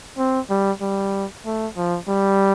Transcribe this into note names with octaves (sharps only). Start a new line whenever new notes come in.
C4
G3
G3
A3
F3
G3